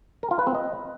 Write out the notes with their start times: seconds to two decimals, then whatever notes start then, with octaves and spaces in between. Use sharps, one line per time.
0.23 A#4
0.31 F4
0.39 B4
0.47 C4
0.55 D#5